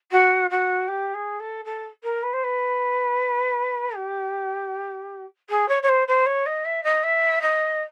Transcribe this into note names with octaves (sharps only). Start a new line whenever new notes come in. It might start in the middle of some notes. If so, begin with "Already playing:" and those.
F#4
F#4
G4
G#4
A4
A4
A#4
B4
C5
B4
G4
G#4
C#5
C#5
C5
C5
C#5
D#5
E5
D#5
E5
D#5